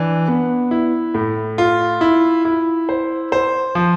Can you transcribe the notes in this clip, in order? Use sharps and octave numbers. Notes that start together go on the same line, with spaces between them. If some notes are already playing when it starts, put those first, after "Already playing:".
Already playing: E3 D4
B3
E4
A2
F4
E4
E4
C5
C5
F3